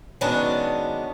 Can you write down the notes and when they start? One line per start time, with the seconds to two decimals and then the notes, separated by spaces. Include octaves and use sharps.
0.21 D#3 F#3 G#3 B3 C#4 D4